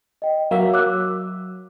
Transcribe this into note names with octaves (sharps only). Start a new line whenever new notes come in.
D#5 G5
F#3 A#3 A#4 E5 F5
F#3 D6 E6 F#6